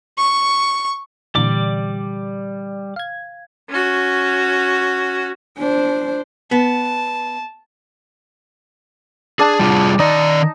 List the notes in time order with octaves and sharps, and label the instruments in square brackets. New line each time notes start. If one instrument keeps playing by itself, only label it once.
[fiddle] C#6
[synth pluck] A#2 D3 E3 [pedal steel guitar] G3 D5 D6
[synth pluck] F5 G#6
[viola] C#4 F#4
[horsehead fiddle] D4 C5
[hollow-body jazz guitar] B3 [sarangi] A5
[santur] D4 A5 [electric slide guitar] G#4
[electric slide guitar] G3 F4 G#4
[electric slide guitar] D#3 D5 [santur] D#4